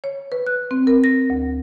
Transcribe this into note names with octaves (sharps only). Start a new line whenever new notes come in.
C#5
B4
F#6
C4
A#4
A#6
D2